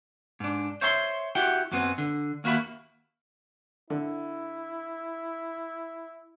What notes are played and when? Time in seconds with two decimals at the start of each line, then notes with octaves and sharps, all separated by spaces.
0.40 G#2 D4
0.81 C5 C#5 E5 A#5 C6
1.35 E4 F#4 G4 F#5 G5
1.71 F#2 F#3 B3 C4
1.98 D3
2.44 D#2 A#3 F#4 E5 B5
3.90 D3 E4